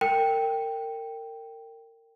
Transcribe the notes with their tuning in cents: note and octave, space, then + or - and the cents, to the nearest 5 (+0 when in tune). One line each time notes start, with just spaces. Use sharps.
A#4 -30 G5 +0